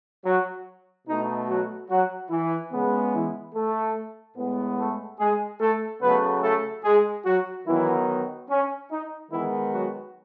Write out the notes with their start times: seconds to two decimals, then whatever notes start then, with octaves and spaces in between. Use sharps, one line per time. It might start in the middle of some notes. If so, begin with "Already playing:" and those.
0.24 F#3 F#4
1.06 B2 A3 D#4
1.48 F#3 F#4
1.89 F#3 F#4
2.30 E3 E4
2.72 C#3 G#3 B3
3.13 E3 E4
3.54 A3 A4
4.37 A2 G#3 B3
4.78 A3 A4
5.19 G#3 G#4
5.60 A3 A4
6.01 C#3 F#3 A3 B3 B4
6.42 A3 A4
6.84 G#3 G#4
7.25 F#3 F#4
7.66 D#3 E3 F#3 B3 E4
8.49 C#4
8.91 D#4
9.31 D#3 E3 G#3 B3 E4
9.72 F#3 F#4